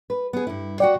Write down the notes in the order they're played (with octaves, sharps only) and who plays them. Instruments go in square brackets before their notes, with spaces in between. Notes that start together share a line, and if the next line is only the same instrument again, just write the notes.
[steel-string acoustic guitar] B4
B3 G#4
G2 E4
[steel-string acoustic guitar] F#4 F#5 G5 [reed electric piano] D5